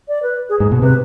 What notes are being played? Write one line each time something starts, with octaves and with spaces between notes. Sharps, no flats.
D5
B4
G#4
G#2 G#4
B2
C3 B4